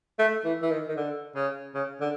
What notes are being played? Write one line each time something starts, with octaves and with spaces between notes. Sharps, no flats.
A3
E3
E3
D#3
D#3
D3
C#3
C#3
D3